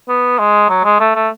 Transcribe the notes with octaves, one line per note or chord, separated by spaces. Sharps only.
B3
G#3
F#3
G#3
A3
A3